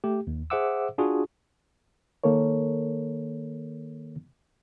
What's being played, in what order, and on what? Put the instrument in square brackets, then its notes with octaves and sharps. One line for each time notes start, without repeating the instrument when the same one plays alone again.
[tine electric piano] A3 G4
D#2
G#4 C5 E5 F#5 D6 E6
D4 F4 F#4 G#4
[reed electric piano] D#3 A#3 A4 A#4 C#5